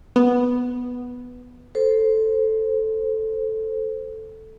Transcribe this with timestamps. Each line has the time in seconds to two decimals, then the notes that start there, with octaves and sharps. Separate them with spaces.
0.16 B3
1.75 A4 C5